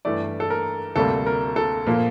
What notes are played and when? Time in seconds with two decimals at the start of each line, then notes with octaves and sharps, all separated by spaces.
0.05 G2 E3 A3 D5
0.40 A4
0.50 A#4
0.96 D2 C3 G3 A#3 A4
1.26 A#4
1.56 A4
1.87 A#2 F3 A#3